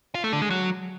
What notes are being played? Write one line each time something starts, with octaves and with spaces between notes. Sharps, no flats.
F4
A3
D3
G#3
F#3